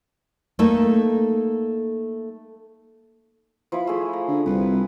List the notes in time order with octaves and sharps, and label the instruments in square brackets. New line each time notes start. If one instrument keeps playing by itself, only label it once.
[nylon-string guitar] A3 A#3 D#4 A4
[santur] F3 E4 B5
A3 G#4
A#5
[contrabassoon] D3
[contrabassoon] C2 [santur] B4